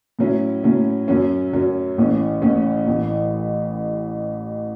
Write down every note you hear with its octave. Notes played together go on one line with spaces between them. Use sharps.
A2 F#3 C#4 E4
A2 F#3 C#4 E4
F#2 F#3 C#4
F#2 F#3 C#4
A1 A2 E3 C#4
A1 A2 E3 C#4
A1 A2 E3